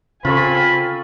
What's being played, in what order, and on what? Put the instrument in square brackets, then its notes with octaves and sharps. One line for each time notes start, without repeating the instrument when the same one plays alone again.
[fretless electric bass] C#3 [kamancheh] C4 G#5 [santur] F4 A4 C#6 [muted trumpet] B5